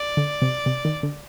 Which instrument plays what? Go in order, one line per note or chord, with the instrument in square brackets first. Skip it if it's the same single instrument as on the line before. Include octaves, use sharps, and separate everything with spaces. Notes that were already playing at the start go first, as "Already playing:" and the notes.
Already playing: [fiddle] D5
[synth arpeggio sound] D3
C3
C3
D#3
D3